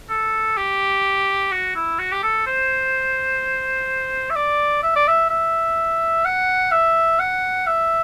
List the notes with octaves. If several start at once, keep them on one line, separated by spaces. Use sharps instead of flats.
A4
G4
F#4
E4
F#4
G4
A4
C5
E5
D5
E5
D5
E5
E5
F#5
E5
F#5
E5